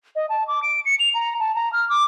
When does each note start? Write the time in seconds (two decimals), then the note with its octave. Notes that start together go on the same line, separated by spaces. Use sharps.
0.16 D#5
0.29 A5
0.48 D6
0.63 D7
0.85 C#7
1.00 F7
1.14 A#5
1.40 A5
1.55 A#5
1.73 F6
1.90 D6